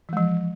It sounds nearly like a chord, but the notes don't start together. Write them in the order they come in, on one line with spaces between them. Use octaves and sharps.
E3 G#3 F3